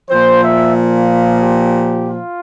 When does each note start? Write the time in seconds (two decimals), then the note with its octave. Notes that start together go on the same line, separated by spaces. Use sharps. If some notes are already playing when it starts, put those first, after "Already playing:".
0.10 A#2 F3 C5
0.44 E5
0.76 F5
1.42 G4
2.08 F4